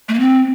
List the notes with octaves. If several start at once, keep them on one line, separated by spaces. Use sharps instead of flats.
A3
A#3
C4